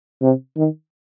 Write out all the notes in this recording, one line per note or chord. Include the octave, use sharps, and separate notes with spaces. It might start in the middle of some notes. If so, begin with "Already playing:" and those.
C3
D#3